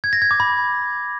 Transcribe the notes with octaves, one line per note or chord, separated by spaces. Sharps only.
G#6
A#6
G#6
D6
B5